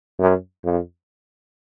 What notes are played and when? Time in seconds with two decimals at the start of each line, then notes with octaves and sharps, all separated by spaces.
0.20 F#2
0.64 F2